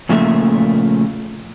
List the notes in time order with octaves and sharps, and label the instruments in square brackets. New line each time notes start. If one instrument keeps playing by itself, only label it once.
[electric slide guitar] A#2 C#3 F3 A3 A#3 E5